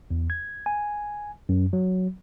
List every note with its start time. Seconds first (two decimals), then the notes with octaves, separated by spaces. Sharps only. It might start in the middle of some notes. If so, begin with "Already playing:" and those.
0.11 E2
0.30 G#6
0.66 G#5
1.49 F#2
1.73 F#3